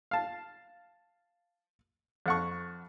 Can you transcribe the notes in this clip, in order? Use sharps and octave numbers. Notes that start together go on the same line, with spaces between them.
F5 A5
F2 F#5 C#6